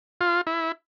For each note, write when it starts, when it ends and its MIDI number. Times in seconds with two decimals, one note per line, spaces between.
0.21 0.41 65
0.47 0.72 64